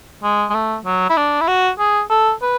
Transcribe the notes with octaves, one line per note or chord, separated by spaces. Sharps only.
G#3
G#3
A3
F#3
E4
D4
E4
F#4
G#4
A4
B4